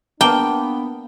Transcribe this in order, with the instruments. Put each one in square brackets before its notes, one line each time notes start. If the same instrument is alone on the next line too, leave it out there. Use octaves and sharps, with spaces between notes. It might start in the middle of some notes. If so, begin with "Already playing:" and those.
[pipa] A#3 [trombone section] B3 D4 [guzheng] G5 [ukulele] A5